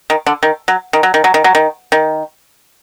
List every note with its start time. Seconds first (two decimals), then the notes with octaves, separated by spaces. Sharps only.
0.10 D#3
0.26 D3
0.43 D#3
0.68 F#3
0.93 D#3
1.03 F#3
1.14 D#3
1.24 F#3
1.34 D#3
1.44 F#3
1.55 D#3
1.92 D#3